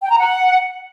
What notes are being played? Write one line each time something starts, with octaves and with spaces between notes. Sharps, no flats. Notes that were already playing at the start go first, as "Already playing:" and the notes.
G5
A#5
F#5